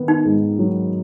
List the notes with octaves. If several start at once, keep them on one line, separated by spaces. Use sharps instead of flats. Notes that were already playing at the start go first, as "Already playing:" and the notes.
Already playing: D#3 B3
D#4
G#2
F#3